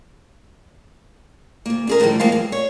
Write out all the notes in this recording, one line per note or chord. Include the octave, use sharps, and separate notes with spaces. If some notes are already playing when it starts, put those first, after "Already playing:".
D2 A#3
C#4 G#4 A#4
A2 D3 D#3 F3 G3
A2 F3 G#3 A#3 D#5 F5
G2
C#5